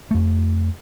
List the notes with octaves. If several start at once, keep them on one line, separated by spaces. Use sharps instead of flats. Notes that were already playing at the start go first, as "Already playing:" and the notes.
F2 A3